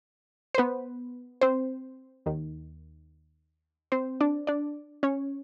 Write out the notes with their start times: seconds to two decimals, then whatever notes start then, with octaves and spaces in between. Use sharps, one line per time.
0.54 C5
0.58 B3 B4
1.41 C4 C5
2.26 D#2 D#3
3.92 C4 C5
4.21 D4 D5
4.47 D4 D5
5.03 C#4 C#5